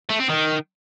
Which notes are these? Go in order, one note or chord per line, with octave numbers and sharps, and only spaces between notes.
A3
C4
D#3